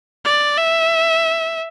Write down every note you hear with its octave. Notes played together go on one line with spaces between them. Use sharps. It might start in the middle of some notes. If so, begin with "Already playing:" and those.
D5
E5